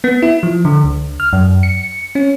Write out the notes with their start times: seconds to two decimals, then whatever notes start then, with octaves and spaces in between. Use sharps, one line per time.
0.04 B3
0.22 E4
0.43 F3
0.65 D3
0.84 C#2
1.20 F6
1.33 F#2
1.63 C#7
2.15 C#4